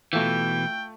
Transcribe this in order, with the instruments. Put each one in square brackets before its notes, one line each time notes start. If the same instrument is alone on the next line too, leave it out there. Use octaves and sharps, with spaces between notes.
[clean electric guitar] B2 E3 [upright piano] A3 F4 [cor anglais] G5